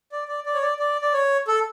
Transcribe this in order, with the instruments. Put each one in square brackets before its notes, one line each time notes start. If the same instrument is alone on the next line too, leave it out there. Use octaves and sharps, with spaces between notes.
[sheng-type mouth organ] D5
D5
D5
C#5
D5
D5
D5
C#5
A4